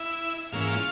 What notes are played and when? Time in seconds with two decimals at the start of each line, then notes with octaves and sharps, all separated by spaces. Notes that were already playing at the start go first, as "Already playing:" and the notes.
Already playing: E4 E5
0.52 G#2 E3 A#3 C#4 F5
0.61 E5
0.67 F4 F5